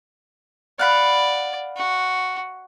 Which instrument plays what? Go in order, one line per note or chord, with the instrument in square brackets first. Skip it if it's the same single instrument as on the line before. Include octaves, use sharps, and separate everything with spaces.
[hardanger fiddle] D5 [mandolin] F5 F#5 B5
[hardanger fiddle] F#4